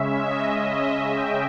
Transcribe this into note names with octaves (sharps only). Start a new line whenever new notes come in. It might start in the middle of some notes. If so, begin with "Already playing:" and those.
Already playing: C#3 G#3 C#4 E5
D#5
E5
G5